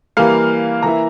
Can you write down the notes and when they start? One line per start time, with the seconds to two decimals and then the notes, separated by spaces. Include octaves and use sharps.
0.17 E3 G3 A#3 F5
0.83 E3 A#3 E4 A#5